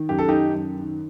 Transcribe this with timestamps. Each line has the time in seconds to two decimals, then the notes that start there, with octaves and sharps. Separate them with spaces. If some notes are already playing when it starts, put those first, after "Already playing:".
Already playing: D#3
0.09 F#2 G4
0.19 A4
0.28 D#3 D#4 G4
0.55 F#2
0.78 D#3